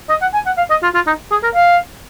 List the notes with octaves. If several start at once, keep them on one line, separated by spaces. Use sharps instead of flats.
D#5
F#5
G#5
F#5
F5
D#5
F4
F4
D#4
G#4
A#4
F5